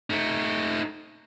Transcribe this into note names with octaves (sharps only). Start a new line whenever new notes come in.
A3 D#4